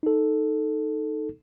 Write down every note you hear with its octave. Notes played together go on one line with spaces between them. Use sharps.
D#4 A4